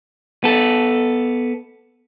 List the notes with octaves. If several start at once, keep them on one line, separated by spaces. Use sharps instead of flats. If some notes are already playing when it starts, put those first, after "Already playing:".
B3 A4